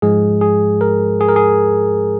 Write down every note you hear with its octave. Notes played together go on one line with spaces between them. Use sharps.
G#2 F3 G#3 G#4
G#4
A#4
G#4
A#4
G#4